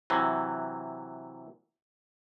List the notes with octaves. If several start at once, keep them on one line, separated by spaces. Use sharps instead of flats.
C3 E3 F#3